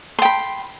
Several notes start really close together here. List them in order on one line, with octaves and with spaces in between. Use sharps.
C6 G5 B5